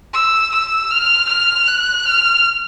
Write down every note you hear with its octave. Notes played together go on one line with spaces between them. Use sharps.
E6
E6
F6
F6
F#6
F6